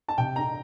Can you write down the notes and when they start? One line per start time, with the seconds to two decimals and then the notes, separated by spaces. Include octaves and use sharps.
0.08 A5
0.18 C3 G5
0.36 D4 A#5